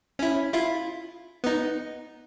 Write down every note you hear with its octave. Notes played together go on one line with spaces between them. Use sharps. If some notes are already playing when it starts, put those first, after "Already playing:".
C#4 E4
E4 F4
B3 D#4